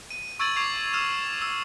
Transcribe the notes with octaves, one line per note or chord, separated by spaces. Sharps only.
D#7
C#6 E6 G#6 A6 D#7 F#7
C#6 D6 G#6 C7 F7
D6 E6 F6 E7 F7
E6